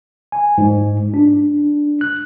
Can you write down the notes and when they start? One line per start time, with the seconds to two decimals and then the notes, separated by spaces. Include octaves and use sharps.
0.32 G#5
0.58 G#2
1.14 D4
2.01 F#6